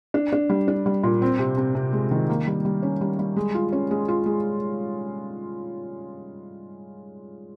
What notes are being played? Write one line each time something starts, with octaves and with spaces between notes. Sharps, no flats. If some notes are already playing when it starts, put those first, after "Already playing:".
D4
D4
G3
D4
G3
A#2
C4
C3
C3
C3
G#3
D#3
A#3
G3
G3
C#4
G3
G3
G#3
F4
C#4
G#3
F4
G#3